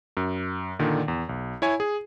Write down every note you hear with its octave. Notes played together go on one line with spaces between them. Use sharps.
F#2
A#2 D3 D#3
E2
B1
E4 C#5 G#5
G#4